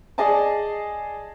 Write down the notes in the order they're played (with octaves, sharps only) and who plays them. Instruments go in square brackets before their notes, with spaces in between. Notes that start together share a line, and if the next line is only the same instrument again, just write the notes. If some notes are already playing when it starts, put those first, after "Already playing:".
[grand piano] G#4 D5 D#5 G#5 A5